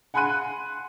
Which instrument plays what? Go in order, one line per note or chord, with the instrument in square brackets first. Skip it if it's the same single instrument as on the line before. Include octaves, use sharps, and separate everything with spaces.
[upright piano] F#5 G#5 B5 C6 F#6 D#7